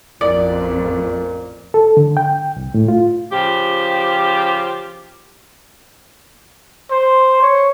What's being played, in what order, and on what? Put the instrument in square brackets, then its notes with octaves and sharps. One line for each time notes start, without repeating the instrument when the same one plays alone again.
[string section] A1 F2 [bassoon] A#2 [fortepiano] D5
[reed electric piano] A4
D3
G5
C2
A2
F4
[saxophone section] C#3 F3 G4
[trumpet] C5
C#5